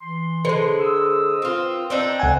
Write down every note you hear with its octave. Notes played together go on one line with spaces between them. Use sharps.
E3 C6
D3 G#3 B4 C5
A#4 D#6 E6
C4 F4
C4 D4 D#4
C#2 F#5 G#5